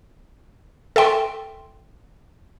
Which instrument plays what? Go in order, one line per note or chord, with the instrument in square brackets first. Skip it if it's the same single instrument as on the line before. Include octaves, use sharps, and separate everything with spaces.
[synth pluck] A4 E5 G5 C6